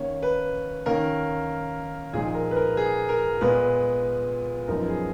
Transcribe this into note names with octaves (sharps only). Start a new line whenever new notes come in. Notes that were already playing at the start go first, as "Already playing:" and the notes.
Already playing: D#3 A#3 C#4 C#5
B4
D#3 A#3 C#4 A#4
A#2 F3 G#3 D#4 G#4
A#4
B4
A#4
G#4
A#4
A#2 G#3 B3 B4
F#2 F3 G#3 B3 D#4 A#4
G#4